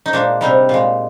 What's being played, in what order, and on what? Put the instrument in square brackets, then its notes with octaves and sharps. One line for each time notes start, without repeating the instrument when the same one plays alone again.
[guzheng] D#4
A#2 G#3 D4
C3 G3 D#4
A#2 G#3